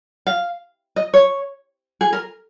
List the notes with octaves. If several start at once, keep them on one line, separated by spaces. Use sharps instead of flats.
F5
D#5
C#5
G#4
A#4